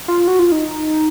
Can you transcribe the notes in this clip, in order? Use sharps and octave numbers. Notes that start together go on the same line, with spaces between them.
F4
F#4
F4
D#4